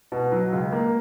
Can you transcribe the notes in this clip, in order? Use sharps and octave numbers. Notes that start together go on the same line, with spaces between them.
B2
F#3
C#2
A#3